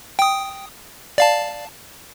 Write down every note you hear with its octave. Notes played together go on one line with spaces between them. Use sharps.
G5 D#6
D5 F5 A5